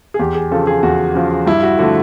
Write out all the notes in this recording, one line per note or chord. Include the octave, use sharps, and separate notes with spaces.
G#4
E2 G4
G#4
C#3 F3 A4
G#4
E2 F#4
C#3 F3
G2 E4
F#4
D3 F3 A3 F#4